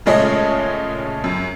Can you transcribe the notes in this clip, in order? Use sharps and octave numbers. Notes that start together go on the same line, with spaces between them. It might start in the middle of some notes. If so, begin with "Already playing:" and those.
A#2 C#3 G#3 A3 C#4 D#5
F#2